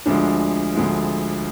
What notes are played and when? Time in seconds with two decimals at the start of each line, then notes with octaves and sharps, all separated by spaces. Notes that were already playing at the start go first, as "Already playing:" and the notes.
0.06 D2 D3 F3 G#3 D4
0.75 D2 D3 F3 G#3